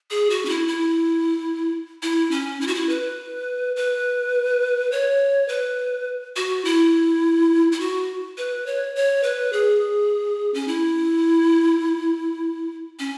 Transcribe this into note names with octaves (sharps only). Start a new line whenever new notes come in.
G#4
F#4
C#4
E4
E4
E4
C#4
E4
F#4
E4
B4
B4
C#5
B4
F#4
E4
E4
F#4
B4
C#5
C#5
B4
G#4
C#4
E4
C#4